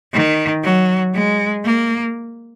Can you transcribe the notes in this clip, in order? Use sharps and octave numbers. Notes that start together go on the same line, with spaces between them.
D#3
F#3
G#3
A#3